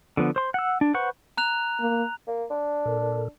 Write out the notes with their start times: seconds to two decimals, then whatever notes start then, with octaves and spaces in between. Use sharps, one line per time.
0.17 D3 F3 B3
0.36 C5 C6
0.54 F#5 E6
0.81 D4
0.94 B4 C5 F#5 C#6
1.37 A#5 F#6 F7
1.80 A#3
2.27 A#3
2.50 D4
2.86 A#2 A4 A#4